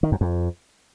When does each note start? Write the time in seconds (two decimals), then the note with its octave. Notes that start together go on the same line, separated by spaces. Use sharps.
0.03 D#3
0.12 F#2
0.21 F2